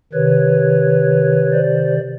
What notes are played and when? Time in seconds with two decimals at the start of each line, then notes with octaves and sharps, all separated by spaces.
0.13 C3 D#3 B4 C#5
1.52 C5 D5